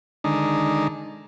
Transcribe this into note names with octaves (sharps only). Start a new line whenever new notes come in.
D3 D#3 G#3 D4 D#4